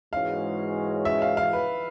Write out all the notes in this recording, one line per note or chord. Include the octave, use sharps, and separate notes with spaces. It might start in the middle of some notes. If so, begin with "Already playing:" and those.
G#2 E3 G#3 C#4 F#4 F5
E5
F5
F5
B4